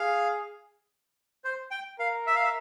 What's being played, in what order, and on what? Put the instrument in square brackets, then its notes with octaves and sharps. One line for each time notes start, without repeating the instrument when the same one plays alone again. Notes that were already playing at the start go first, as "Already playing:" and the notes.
Already playing: [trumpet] G#4 [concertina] F5
[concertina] C5
G5
[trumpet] A#4 [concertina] F5
[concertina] E5
F5
E5